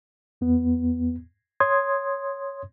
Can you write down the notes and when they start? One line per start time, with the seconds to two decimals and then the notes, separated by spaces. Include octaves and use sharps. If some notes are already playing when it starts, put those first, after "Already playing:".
0.41 E2 B3
1.60 C#5 C6 D#6 G#6